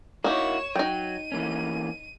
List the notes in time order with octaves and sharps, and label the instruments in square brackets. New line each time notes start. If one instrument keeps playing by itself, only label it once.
[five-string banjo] A#3 D#4 [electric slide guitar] E4 F#4 [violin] C#5 E7
[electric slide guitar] F#3 [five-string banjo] D#4 G5 [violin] D#7
[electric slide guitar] E3 A#3 C#4